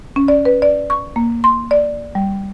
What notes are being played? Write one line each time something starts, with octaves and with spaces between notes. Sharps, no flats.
C#4
D5
B4
D5
C#6
A#3
C6
D5
G3